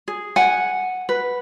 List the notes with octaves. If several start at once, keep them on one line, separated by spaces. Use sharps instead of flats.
G#4
F#5 G#5
B4